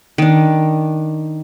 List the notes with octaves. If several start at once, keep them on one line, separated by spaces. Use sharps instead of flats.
D#3 D4